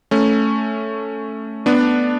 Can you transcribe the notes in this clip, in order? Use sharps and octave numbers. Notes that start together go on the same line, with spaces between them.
A3 C#4
B3 D4